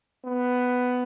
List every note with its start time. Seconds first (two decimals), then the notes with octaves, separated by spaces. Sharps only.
0.22 B3